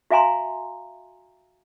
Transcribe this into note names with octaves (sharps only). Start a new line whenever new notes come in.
F#4 E5 F5 G#5 A#5 C6